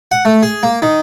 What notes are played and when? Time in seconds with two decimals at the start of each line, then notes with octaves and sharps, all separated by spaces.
0.12 F#5
0.25 A3
0.43 G#4
0.63 A#3
0.82 D#3